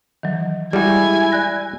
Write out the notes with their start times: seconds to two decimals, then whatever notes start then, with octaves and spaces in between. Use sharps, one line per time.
0.23 D#3 E3 F#3
0.73 G3 G#3 E4 F#4 G#5
1.32 D5 F#6 A#6